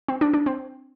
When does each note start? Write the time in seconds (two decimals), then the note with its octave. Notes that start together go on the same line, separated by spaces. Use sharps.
0.08 C4
0.21 D4
0.33 D4
0.46 C4